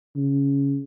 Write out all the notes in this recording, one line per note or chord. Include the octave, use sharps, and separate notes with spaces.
C#3